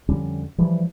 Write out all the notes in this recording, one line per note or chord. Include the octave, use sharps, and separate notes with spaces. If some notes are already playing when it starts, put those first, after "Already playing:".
F2 D3 G3 C#4
E3 F3 G3